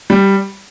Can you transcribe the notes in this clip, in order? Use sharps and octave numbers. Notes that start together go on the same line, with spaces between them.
G3